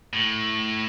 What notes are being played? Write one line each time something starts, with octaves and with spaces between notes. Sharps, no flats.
A2